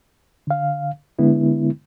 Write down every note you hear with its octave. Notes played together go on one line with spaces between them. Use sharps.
D3 F5
D3 G#3 B3 E4